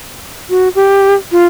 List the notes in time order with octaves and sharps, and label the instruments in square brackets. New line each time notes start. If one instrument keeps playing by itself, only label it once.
[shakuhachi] F#4
G4
F4